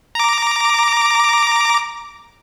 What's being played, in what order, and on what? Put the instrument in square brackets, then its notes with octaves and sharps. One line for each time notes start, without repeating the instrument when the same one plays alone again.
[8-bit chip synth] A#5 D6